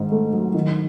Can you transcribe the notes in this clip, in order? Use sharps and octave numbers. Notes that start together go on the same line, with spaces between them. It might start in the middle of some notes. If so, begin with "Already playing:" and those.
Already playing: G#2 D#3
A3
F#3
D#3